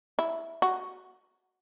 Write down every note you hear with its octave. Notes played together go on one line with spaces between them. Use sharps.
E4
F#4